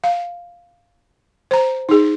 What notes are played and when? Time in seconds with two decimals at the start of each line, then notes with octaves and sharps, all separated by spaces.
0.04 F5
1.51 C5 A#5
1.89 D#4 G#4